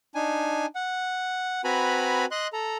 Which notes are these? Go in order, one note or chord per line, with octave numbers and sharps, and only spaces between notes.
D4 D#4 G#5
F#5
C4 F#4 B4 G#5 A#5 B5
D#5 C6 F#6
A4 A#5